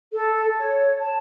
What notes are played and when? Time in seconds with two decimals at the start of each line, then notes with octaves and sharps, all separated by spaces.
0.12 A4
0.56 C#5
1.00 A5